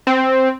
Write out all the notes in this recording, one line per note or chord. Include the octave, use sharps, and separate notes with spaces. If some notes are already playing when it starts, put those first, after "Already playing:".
C4